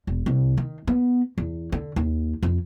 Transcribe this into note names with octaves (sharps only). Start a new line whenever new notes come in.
E1
C2
D#3
B3
E2
D3
D#2
F2